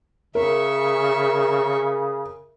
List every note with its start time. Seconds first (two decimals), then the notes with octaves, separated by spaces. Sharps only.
0.35 C#3 A#4 E5 C#6